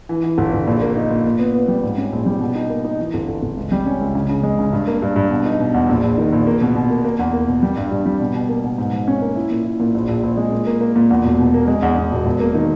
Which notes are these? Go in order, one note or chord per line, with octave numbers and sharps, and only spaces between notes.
E3
E3
G1
G1
A#1
A#3
D#4
A#2
A#2
B3
B3
G3
G#2
C#4
A#1
G3
B2
D#4
A#3
D#4
E3
G1
G1
G1
C#2
G3
C#4
C#2
C#3
C#3
G#3
C#3
G2
A#3
G2
G2
B2
D#4
B2
E2
A#1
A#1
D#3
A#1
A#3
B2
B2
A#3
A#3
E2
A#3
B2
G3
G2
G2
G3
B2
B2
A#3
B2
G#2
G#2
C#4
A#3
E4
A#2
E4
A#2
A#1
A#1
A#1
G#3
A#2
A#3
A#3
A#2
E2
E1
B2
A#3
G#3
E2
E2
E1
E1
A#3
D#3